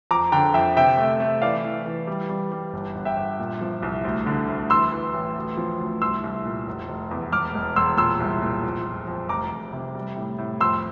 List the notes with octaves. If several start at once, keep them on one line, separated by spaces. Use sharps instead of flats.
F2 A#5 D6
D3 G5 A#5
F2 E5 G5
C3 E5 G5
A3
A3
E3 D5 F5
E3
E3
G3
G3
G3
G1
G1
E5 G5
G1
A#2
F3
C2
D2
D3
D2
E3 C6 E6
E3
A1
D2
F3
D2
C2 C6 E6
C2
A#2
F1
F1
E2
E1 D6 F6
E1
E1 C6 E6
A#2 C6 E6
C2
A#2
F2
F2
F2
F1 A#5 D6
F1
C3
G3
A2
A2
F2 C6 E6